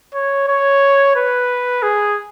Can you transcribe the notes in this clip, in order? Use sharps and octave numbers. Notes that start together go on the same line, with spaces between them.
C#5
C#5
B4
G#4